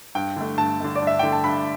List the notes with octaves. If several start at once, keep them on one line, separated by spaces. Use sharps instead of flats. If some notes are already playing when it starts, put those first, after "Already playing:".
G2 G5
D3 A3
G2 A5
D3 A3
D5
G2
E5
D3 A3 G5
A5
G2 B5